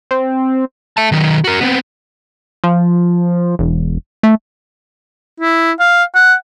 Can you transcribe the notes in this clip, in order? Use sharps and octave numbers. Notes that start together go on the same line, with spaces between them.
C4
E5 A5
D#3 F#3
F#4 A#4
B3 C4
F3
E1
A3
E4
F5
F#5